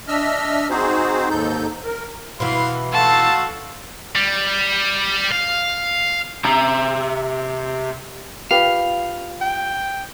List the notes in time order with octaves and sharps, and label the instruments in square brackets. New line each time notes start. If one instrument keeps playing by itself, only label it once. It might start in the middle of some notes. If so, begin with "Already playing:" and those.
[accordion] D4 D#5 E5 E6 F6
C4 D#4 F#4 G#4 C5
D#2 G#2 D#4 A4 G6
A#4
[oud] B2 E3 [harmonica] F5 B5 C6
[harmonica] A3 F#4 [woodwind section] F5 C6 E6 [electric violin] A5
[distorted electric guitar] G3
F5
[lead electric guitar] C3 A#5
[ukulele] F4 G4 B4 [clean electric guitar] F5
[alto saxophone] G5